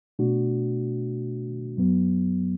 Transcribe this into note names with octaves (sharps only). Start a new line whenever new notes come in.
B2 A3 D4 F#4
F#2 F#3 B3